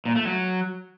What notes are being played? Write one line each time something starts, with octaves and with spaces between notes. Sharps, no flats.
A#2
A3
F#3